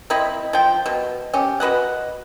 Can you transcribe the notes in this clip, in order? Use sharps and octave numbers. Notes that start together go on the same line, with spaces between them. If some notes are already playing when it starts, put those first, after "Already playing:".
C4 E4 D#5 B5
F3 G5
B2
C#4 G4
F#4 B4 D#5 F#5